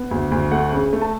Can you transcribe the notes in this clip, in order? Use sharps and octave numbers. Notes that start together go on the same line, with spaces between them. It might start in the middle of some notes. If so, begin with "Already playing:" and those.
Already playing: B3
D2
D2
A3 F#5
C#3
A3
A5